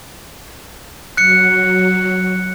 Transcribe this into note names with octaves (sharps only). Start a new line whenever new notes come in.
F#3 F#6 C#7